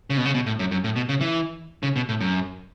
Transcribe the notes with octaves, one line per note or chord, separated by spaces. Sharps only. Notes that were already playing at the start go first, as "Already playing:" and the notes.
C#3
B2
C#3
B2
A2
F#2
F#2
A2
B2
C#3
E3
C#3
B2
A2
F#2